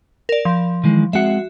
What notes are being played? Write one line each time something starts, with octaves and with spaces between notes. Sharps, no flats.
A#4 D5
F3
D#3 E3 G#3
G#3 C4 F#4 E5 F#5